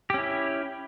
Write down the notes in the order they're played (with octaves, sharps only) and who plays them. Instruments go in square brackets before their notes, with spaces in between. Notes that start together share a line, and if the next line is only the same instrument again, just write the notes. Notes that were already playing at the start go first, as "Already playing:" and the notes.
[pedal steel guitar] G4
C#4
E4